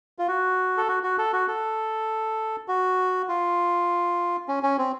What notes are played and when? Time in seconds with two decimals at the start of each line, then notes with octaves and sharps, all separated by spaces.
0.19 F4
0.28 F#4
0.77 A4
0.88 F#4
1.03 F#4
1.18 A4
1.33 F#4
1.48 A4
2.68 F#4
3.28 F4
4.48 C#4
4.63 C#4
4.78 C4